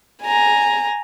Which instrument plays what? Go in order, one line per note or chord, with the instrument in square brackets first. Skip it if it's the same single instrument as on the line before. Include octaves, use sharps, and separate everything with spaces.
[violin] G#5 A#5